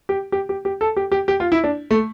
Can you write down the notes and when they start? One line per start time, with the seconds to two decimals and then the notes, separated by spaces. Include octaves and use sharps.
0.09 G4
0.32 G4
0.49 G4
0.65 G4
0.81 A4
0.97 G4
1.12 G4
1.28 G4
1.40 F4
1.52 E4
1.64 D4
1.91 A3